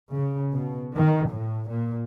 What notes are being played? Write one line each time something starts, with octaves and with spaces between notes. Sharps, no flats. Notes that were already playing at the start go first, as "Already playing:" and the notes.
C#3
B2
D#3
A2
A#2